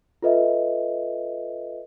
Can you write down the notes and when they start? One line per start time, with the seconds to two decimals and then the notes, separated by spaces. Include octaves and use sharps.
0.22 F4 A4 B4 D#5 E5